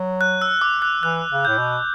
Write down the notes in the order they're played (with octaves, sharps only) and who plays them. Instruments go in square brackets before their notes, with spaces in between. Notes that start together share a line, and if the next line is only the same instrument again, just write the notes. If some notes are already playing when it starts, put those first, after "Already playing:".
Already playing: [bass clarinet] F#3
[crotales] F#6
E6
D6
F#6
[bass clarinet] E3 [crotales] F#6
[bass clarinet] C#3
[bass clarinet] A2 [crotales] G6
[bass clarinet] B2